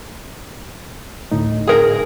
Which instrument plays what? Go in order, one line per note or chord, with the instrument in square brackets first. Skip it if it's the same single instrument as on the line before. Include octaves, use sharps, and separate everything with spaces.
[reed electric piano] D2 A2 D#4
[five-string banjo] G#4 A#4